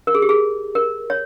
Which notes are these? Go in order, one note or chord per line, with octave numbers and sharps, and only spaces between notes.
A#4
G#4
G4
G#4
A#4
C#5